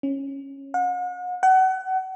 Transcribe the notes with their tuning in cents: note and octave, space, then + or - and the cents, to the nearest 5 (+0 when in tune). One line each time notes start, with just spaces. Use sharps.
C#4 -15
F#5 -40
F#5 +30